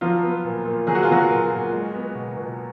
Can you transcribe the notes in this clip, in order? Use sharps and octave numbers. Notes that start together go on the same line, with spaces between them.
F3 F#3 F4
B3
A#2
A#2
F#3 G#4
F#4
F4
F#3 B3 F#4
A#2
A#2
G#3
B3
B2
B2